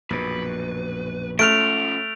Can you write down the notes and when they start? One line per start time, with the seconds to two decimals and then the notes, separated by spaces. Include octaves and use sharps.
0.10 A#1 F#2 B2 B4
1.39 F3 A3 C#4 F6 D7 F7